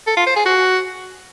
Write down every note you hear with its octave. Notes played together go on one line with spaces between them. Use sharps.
A4
F4
C5
G#4
F#4